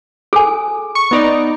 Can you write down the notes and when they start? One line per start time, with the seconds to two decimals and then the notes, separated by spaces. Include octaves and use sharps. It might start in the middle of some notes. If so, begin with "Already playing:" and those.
0.33 G#4 A4 G#5
0.95 C#6
1.11 B3 D#4 D5